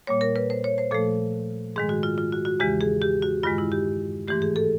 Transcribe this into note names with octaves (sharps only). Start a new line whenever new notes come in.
A#2 G3 A#3 C#5
A#4
B4
C5
C#5
C5
A#2 F3 A3 A4
G#2 D#3 G#3 G#4
F#4
F4
F4
F#4
F#4
E2 C#3 E3 G#3 G4
G#4
G4
F#4
G2 D#3 G#3 F4
E4
G4
G#2 E3 A3 G4
G#4
A4